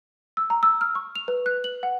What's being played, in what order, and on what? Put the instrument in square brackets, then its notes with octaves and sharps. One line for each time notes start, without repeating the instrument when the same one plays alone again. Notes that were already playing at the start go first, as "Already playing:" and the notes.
[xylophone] E6
A#5
E6
F6
C#6
F7
B4
F#6
F#7
F#5